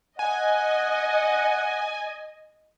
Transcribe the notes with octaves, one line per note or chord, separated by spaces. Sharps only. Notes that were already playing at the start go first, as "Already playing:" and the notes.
D#5 F#5 G#5